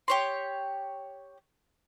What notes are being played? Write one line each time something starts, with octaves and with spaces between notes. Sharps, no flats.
G4 C#5 C6